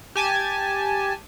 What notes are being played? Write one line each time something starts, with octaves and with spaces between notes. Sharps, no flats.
G4 G#5 A5